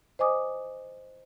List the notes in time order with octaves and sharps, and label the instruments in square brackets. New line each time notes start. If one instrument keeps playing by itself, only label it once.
[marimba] C5 D#5 G#5 D6 D#6